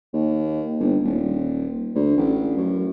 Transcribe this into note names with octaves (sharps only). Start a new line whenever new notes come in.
D#2
G1
D#1
D2
A1
F#2